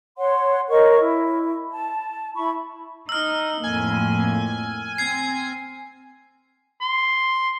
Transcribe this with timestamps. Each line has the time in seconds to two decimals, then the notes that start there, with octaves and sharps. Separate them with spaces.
0.18 C#5 F#5 C6
0.69 A#4 C#5 D#5 C#6
1.00 E4
1.71 A5
2.35 E4 B5 C#6
3.09 D#4 E6 F6
3.63 F2 A2 A#3 G#5
4.98 C4 G#6 C7
6.82 C6